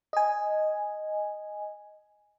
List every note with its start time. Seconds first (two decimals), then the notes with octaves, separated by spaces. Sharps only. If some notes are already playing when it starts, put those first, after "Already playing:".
0.13 D#5 G#5